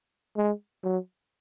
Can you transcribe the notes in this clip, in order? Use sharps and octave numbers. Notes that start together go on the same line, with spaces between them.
G#3
F#3